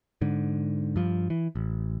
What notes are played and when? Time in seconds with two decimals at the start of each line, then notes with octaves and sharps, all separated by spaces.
0.21 G#2 D3
0.96 G2 F3
1.30 E3
1.55 A1